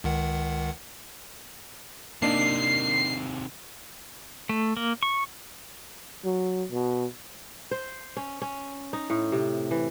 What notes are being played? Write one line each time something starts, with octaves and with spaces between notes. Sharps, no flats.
C#2 D#3 F#5
C3 D#3 A#3 D4 D#4 C7
A3
A#3
C#6
F#3
B2
C5
C#4
C#4
D#4
A2
C3
E3